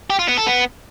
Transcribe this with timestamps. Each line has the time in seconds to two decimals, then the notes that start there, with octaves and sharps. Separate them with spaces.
0.10 G4
0.19 F4
0.28 B3
0.37 A4
0.46 B3